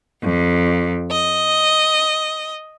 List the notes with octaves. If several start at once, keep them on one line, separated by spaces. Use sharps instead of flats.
F2
D#5